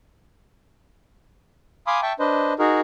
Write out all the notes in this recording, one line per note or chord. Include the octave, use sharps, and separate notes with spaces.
F5 G#5 B5 C6 D6 D#6
E5 G5 A5 C#6
D4 B4 C5 D#5
D#4 F#4 G#4 A#4